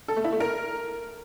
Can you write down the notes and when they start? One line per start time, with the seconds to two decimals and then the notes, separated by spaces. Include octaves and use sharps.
0.08 A4
0.16 A3
0.24 E4
0.32 A3
0.40 A#4